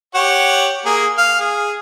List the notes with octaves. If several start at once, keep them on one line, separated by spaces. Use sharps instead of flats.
G4 C#5 F#5
A#3 G#4
F5
G#4